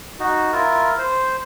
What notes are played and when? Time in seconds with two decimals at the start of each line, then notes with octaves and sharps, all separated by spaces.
0.19 D#4 F#4
0.52 E4 F4 A#4
0.98 C5